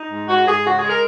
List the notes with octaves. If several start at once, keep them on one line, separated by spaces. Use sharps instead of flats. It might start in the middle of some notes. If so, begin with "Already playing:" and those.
Already playing: D#4
G#2
G#2 F#4
G#2 G#4
C#3 F#4
G#4
G#3
A#4